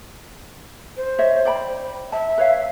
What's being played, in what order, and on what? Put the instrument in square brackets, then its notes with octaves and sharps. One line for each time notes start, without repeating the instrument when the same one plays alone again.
[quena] C5
[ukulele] C#5 D#5 E5
D5 G5 B5
[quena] E5 [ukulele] A5
[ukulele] B4 C#5 F5